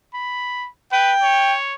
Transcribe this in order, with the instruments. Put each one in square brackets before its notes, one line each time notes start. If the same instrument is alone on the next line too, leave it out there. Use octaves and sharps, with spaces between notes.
[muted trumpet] B5
[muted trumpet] B4 [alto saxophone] G5
[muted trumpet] C#5